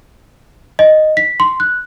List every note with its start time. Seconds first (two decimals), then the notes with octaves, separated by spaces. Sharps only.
0.79 D#5
1.17 B6
1.40 C6
1.60 F#6